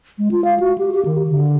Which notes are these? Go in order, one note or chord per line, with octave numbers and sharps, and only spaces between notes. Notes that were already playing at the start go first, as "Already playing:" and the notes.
G#3
F4
F5
F#4
G4
G4
D#3
D3